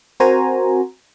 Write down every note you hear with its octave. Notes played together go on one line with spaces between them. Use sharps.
C4 F#4 A#4 C5 G#5 A#5